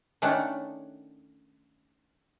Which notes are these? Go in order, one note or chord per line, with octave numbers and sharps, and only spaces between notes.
D#3 A3 C#4 D4 F#5